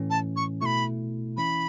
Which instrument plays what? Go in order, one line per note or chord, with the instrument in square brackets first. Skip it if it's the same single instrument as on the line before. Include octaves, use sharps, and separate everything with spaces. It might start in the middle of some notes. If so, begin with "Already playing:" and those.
Already playing: [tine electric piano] A2 E3 A3 C#4
[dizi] A5
C#6
[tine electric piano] B2 A3 E4 [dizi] B5 C#6
[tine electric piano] E3 C#4 E4 [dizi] B5